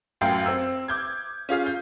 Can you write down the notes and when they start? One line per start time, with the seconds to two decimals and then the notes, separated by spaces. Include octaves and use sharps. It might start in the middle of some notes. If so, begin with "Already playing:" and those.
0.21 A1 F#2 F#3 F5 G5 C7
0.46 C4 E6
0.88 D6 G6 G#6
1.49 C#4 F4 G#4 F5
1.66 G6